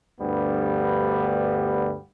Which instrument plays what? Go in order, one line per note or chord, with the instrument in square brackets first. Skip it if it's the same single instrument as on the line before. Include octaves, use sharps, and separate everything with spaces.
[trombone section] D2 G2 G3 B3